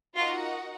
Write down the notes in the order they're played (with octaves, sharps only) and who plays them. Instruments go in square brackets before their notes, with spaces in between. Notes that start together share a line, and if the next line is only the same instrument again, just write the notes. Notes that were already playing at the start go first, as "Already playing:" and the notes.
[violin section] D#4 F#4 A#4 D#5 F#5 [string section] F4